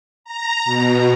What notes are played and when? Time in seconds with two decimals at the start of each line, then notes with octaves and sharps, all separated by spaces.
0.24 A#5
0.65 B2